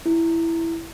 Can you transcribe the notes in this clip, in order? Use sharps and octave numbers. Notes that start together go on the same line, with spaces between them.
E4